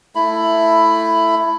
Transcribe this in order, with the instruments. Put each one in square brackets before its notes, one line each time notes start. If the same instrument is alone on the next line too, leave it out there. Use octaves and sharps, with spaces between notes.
[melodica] A3 E4 B5